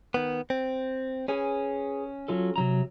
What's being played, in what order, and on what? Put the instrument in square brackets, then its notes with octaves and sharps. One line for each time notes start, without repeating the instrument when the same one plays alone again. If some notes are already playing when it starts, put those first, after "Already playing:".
[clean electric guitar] D#3 B3
C4
[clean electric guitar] C#4 [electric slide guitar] G#4 B4 G#5
[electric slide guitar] F#3 F4 A4
C3 F#3 A#5